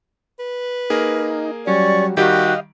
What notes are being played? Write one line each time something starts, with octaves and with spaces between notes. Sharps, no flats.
B4
A#3 D#4 G#4 A#4
F#3 G3 C#4 D5 C#6
D#3 G3 F#4 G4 D#5 F5 D7